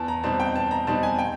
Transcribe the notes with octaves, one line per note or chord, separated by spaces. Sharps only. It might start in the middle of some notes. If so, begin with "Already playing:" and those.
Already playing: E2 A5
A#5
B2 G3 C4 D#4 A5
G5
E2 A5
A#5
B2 G3 C4 D#4 A5
G#5
G5